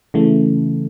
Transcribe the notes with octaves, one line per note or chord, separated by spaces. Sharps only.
C#3 E3 A3